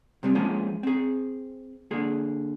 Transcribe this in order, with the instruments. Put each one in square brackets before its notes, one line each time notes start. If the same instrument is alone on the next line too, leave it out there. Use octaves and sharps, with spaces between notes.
[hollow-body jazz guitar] C3 G3 C4
F3 G#3 A#3 C#4 F4 C5
C4 G#4
D3 A#3 G#4